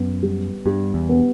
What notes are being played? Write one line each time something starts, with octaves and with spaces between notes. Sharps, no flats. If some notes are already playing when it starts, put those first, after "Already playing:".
Already playing: F#2 B3
G3
G2 G3
E2
B3